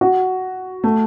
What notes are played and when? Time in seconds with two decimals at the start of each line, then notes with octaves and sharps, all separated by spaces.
0.01 F#4
0.84 A3